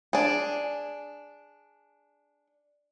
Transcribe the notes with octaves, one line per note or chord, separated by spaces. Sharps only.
D4 G#4